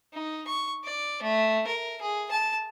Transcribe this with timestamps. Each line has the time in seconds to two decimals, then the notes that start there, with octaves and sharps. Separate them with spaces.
0.13 D#4
0.47 C#6
0.84 D5
1.22 A3
1.67 A#4
2.01 G#4
2.31 A5